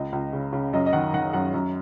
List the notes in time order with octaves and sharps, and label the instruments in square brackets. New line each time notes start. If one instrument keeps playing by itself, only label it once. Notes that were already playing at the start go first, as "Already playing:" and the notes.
Already playing: [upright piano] C#2 D#5
C#2
C#3
C#3
F#2 D#5
D#5
D#3 F#5
D#3 F#5
F#2 F#5
F#2